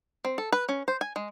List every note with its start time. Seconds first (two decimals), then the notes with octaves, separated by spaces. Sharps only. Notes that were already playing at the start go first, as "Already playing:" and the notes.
0.25 C4
0.38 A4
0.52 B4
0.69 C#4
0.88 C5
1.01 G#5
1.16 G#3